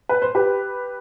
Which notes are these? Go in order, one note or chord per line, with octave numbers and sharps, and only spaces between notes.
B4
C5
G4 B4